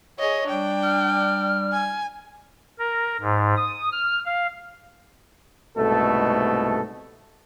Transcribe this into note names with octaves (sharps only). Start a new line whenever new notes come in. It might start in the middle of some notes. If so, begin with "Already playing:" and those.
G#4 C#5 D#5
G3 D4 G5
F6
G#5
A#4
G#2
D#6
F6
F5
C2 G#2 B2 A3 A4